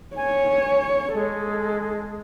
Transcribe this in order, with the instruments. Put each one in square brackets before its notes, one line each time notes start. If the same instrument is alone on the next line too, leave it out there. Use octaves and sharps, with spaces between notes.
[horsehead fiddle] C#5 [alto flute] G#5
[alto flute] G#3 [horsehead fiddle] A4